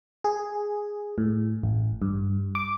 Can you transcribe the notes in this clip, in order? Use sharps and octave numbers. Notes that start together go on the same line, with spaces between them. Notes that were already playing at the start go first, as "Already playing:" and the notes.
G#4
A2
A1
G2
D6